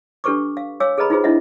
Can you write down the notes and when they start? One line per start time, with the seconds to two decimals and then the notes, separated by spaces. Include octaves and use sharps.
0.24 D4 G4 A4 B4 C#6 D6
0.57 F5
0.80 C#5 F5 G#5 D6 E6
0.98 G#4 A4 B4 D#5 A#5 B5
1.10 D#4 F4 G4 G#4 B4 C5
1.24 D4 E4 D#5 E5 F#5